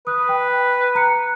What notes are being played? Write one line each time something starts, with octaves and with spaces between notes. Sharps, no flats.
B4 D#6 F#6
G5
A#5 F#6 C#7